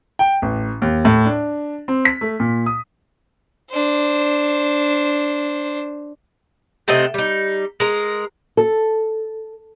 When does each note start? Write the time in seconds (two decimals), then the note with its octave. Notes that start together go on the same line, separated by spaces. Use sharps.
0.19 G5
0.42 A1
0.82 D#2
1.05 A2
1.25 D4
1.88 C4
2.05 B6
2.21 A3
2.40 A#2
2.66 D#6
3.71 D4 C5
6.88 C3 A3 C4 D#5
7.14 G3 D#4
7.80 G#3 A#4
8.57 A4